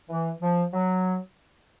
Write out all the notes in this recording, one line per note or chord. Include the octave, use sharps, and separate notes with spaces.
E3
F3
F#3